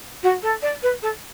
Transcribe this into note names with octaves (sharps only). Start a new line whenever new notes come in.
F#4
A4
D5
B4
A4